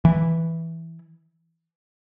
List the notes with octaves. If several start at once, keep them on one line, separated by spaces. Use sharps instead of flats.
E3